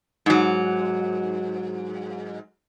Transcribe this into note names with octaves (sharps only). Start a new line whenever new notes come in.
G#2 F#3